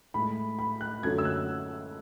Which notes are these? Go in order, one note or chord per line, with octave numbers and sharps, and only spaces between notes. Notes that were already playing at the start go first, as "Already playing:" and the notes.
A2 G#3 B5
B5
F#6
F#2 D3 F#3 A3 G#6
E6
F#6